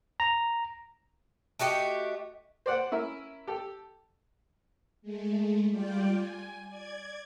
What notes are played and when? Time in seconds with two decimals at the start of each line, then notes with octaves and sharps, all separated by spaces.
0.20 A#5
1.59 A3 F#4 G4 D#5
2.66 C5 D5 F#5
2.92 C#4 E4 A#4
3.47 G4 A4
5.02 G#3 A3
5.70 G3 F4 D5 G5
6.14 G#5
6.69 D5 G#6